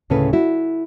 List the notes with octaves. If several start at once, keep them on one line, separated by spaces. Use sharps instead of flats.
D2 A2 C#3 C#4 A4 B4
E4 F#4